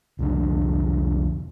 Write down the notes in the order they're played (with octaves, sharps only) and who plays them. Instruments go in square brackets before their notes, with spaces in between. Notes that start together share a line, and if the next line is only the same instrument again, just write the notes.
[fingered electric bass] C2 F2 D3